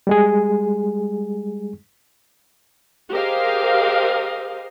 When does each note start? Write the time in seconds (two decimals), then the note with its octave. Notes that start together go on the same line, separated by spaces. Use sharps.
0.07 G3 G#3 G#4
3.11 G4 G#4 A#4 C5 D#5 F5